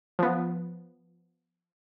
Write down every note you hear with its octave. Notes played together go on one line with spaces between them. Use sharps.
F3 B3